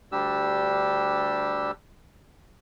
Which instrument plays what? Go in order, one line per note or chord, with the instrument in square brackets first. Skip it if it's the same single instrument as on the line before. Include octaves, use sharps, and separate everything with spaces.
[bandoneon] D2 G3 D4 G4 E6